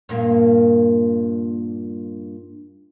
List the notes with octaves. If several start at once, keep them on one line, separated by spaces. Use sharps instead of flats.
G2 A#2 A#3